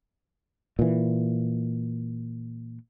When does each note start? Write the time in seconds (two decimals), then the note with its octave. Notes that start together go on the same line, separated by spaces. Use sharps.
0.79 A#2 E3